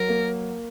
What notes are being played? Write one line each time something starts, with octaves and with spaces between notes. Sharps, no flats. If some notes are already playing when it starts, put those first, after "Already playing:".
Already playing: F#3 A#4
A#3